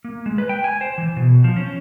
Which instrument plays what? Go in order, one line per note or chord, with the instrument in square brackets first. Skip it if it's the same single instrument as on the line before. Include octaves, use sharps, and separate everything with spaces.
[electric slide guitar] A#3
G#3
B4
G5
G#5
C5
E3
B2
F3
C#4